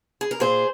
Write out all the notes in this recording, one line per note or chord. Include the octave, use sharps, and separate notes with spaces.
G#4
A#4
A#2 G#4 C5